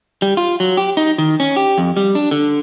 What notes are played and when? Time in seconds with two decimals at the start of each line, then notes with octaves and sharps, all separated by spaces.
0.22 G3
0.37 F4
0.60 F#3
0.77 G4
0.97 D#4
1.18 D#3
1.40 C#4
1.56 G4
1.78 F2
1.97 G3
2.15 D4
2.31 D3